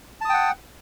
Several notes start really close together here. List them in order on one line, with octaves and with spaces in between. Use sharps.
A5 D#6 G5 F#5